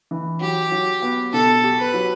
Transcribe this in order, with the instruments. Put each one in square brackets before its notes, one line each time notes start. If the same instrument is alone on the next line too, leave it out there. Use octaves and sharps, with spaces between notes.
[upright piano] E3
[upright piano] F#3 [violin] G4
[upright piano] F#3
B3
[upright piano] B2 [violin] A4
[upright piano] G4
[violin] B4
[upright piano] F#3